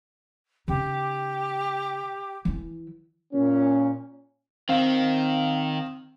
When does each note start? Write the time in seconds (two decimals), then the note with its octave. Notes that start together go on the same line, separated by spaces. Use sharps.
0.68 C#3 D#4 G4
2.45 E3 E4
3.33 A#2 C#4
4.69 D#3 C4 F5